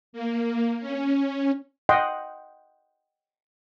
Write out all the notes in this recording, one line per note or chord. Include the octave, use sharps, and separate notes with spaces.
A#3
C#4
D#5 F#5 G5 C6